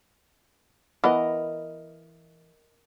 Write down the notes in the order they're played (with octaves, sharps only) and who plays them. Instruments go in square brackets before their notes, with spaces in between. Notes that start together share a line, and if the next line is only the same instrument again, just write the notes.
[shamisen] E3 B3 [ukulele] A#4 D#5